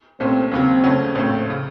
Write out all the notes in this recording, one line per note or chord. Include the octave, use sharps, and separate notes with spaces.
C2 A#2 A3 C4 C#4
D#2 C#3 F#3 C4
F2 C#3 A3 C#4 F#4
A#1 A2 A3 C4 C#4
C#3